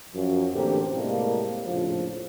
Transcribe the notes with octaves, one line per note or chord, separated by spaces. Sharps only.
F#2 F3
A2 D3 E3 A#3 C4 G4
A2 C3 G3 G#3 A#3
A#1 F2 A2 C#3 F3